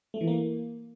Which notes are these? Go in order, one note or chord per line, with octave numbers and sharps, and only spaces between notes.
A3
E3
A#3